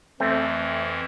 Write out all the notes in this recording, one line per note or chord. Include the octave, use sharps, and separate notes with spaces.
F2 E3 A3 C4